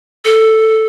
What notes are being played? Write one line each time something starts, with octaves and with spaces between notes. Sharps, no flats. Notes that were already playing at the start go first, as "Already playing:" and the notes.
A4